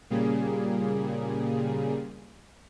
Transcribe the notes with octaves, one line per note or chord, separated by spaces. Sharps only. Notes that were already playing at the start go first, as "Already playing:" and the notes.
A#2 C#3 G3 A#3 G#4